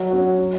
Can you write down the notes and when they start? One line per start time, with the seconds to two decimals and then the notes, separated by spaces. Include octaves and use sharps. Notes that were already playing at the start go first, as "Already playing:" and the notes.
Already playing: F#3
0.11 C#4 F#4
0.39 F#3